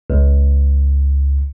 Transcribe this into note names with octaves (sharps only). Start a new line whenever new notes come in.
C#2